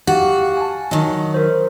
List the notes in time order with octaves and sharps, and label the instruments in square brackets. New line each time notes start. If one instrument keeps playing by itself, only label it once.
[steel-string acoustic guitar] F#4 [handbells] G4 F5
[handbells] G#5 A5
[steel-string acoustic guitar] D#3 F#3 [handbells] D#5
[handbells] A#4 C5